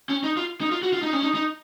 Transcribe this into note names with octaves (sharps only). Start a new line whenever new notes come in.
C#4
D#4
F4
D#4
F4
F#4
F4
D#4
C#4
D#4
D#4